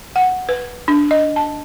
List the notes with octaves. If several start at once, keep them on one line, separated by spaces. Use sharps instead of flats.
F#5
B4
D4
D#5
A5